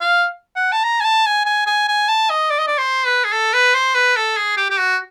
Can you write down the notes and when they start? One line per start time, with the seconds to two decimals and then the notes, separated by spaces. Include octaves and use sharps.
0.01 F5
0.56 F#5
0.72 A5
0.84 A#5
1.00 G#5
1.04 A5
1.26 G#5
1.46 G#5
1.66 G#5
1.88 G#5
2.08 A5
2.30 D#5
2.50 D5
2.58 D#5
2.67 D5
2.78 C5
3.06 B4
3.24 G#4
3.32 A4
3.53 B4
3.74 C5
3.95 B4
4.16 A4
4.37 G#4
4.57 G4
4.70 G4
4.78 F#4